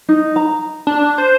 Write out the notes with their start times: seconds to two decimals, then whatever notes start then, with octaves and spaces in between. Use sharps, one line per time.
0.09 D#4
0.36 A#5
0.87 D4
1.18 C5